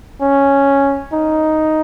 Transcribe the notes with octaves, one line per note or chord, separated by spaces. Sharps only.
C#4
D#4